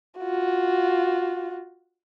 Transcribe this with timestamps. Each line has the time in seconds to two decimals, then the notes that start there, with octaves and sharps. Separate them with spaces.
0.19 F4 F#4